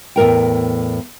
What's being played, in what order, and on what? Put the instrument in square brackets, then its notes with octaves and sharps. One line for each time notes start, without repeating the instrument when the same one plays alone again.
[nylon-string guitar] E2 A2 A#4 G5